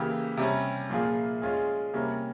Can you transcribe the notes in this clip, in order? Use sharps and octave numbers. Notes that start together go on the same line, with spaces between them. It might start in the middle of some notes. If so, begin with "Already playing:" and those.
Already playing: C#3 E3 A#3 E4 G4
C3 G3 C#4
A#2 F3 A#3 F4 G#4
G#3 C#4 F4 G#4
C3 G3 A#3 C#4